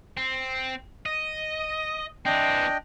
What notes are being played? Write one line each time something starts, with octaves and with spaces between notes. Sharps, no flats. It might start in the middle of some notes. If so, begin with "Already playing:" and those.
C4
D#5
E3 C4 D4 D#5 G5